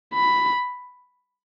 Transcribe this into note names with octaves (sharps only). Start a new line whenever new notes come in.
B5